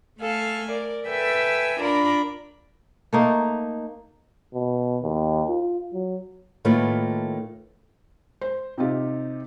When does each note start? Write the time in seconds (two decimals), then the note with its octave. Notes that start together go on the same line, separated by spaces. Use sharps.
0.19 A3 A4 F5 G#5
0.69 A#4 D5
1.07 A4 B4 E5 G5 G#5 E6
1.80 D4 F4 A#4 D5 A#5 B5
3.13 A3 A#3 D#4
4.54 B2
5.03 D#2
5.49 F4
5.93 F#3
6.65 A2 D#3 A3 A#3 F4 B4
8.41 C5
8.78 C3 C4 D#4 F4 G4